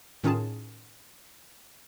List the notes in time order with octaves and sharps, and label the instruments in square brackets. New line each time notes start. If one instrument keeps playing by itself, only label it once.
[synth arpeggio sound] A2 D#3 C#4 F4 G#4 A5